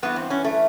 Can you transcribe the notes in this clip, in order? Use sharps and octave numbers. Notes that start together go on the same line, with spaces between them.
G2 E3 B3
C4
C#4
A3